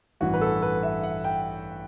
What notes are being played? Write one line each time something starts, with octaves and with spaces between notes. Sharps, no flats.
A1 G2 E3 F#4
B4
A4
B4
E5
F#5
G5